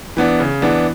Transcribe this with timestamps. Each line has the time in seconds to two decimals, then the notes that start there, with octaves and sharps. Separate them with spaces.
0.17 E3 B3 D4
0.40 C#3
0.62 E3 B3 D4